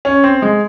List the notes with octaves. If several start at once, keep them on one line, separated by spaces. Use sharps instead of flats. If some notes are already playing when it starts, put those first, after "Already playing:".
C#4
C4
G#3